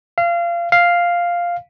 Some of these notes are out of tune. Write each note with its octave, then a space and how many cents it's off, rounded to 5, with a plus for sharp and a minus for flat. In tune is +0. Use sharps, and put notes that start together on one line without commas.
F5 -25
F5 +0